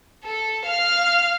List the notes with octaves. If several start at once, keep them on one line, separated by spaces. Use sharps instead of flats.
A4
F5 F6